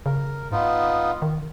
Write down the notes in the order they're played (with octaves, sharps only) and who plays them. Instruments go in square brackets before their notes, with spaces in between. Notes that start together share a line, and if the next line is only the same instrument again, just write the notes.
[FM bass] C#3 [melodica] A#4
[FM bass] G#2 [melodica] B3 D#4 F4
[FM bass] D#3